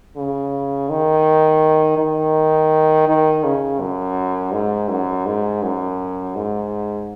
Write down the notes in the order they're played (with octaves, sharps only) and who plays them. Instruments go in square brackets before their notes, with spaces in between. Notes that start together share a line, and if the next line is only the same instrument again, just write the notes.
[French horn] C#3
D#3
D#3
D#3
C#3
F#2
G#2
F#2
G#2
F#2
G#2